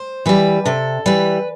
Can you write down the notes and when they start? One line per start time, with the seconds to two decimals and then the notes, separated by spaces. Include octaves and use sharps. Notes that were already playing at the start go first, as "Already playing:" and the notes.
Already playing: C5
0.26 E3 G3 B4
0.65 C3 A4
1.06 E3 G3 B4